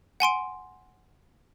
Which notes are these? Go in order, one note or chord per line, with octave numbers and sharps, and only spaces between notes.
F#5 G#5 C6 D7